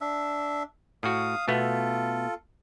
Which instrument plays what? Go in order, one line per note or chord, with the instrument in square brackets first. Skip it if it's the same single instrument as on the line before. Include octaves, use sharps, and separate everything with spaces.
[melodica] D4 E5
[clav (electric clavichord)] A2 F#4 [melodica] F5 D#6
[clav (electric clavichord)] B2 A3 B3 [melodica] F4 A4